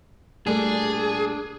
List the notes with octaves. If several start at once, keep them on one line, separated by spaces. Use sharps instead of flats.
A#2 G3 A3 D4 G#4